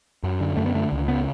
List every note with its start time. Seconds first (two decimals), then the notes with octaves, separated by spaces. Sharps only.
0.23 F#2
0.41 D3
0.57 F#2 A3
0.66 B3
0.74 D3 A3
0.92 C#2
1.08 C#3 B3